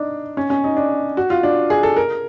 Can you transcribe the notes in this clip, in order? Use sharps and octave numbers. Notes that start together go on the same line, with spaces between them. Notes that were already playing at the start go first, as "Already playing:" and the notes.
Already playing: D4 D#4
C#4
C#4
D#4
D4
F#4
F4
D4
G#4
A4
A#4